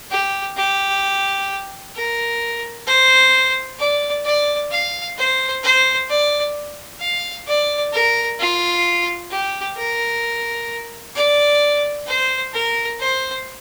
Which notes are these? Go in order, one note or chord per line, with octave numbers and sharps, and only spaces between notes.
G4
G4
A#4
C5
D5
D5
F5
C5
C5
D5
F5
D5
A#4
F4
G4
A#4
D5
C5
A#4
C5